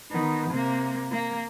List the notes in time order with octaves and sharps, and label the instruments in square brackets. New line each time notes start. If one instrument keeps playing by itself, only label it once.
[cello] D#3 B3
C3 A#3
A#3